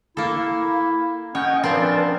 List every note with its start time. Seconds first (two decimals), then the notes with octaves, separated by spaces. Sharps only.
0.17 A#3 E4 A4
1.35 C#4 C#5 D#5 F#5 G5
1.64 F3 C4 D4 A#4 B4 A5